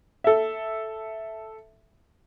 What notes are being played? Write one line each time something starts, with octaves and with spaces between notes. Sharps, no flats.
A4 E5